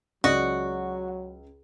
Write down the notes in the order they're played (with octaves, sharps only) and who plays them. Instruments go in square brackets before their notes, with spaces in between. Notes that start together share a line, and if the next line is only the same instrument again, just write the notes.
[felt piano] C#2 [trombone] F#3 [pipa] F#4 [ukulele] D5 D#5